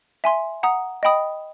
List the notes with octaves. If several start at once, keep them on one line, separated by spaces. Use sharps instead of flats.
E5 G#5 C6
F#5 A#5 D#6
D#5 G5 B5 D#6